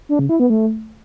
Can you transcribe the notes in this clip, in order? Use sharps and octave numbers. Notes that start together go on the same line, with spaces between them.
D4
C#3
E4
B3
A3